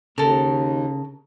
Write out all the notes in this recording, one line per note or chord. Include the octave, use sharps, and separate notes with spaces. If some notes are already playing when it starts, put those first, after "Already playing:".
D#2 C#3 A4 A#4